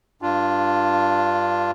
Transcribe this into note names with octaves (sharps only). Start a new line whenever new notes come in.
G2 D4 F4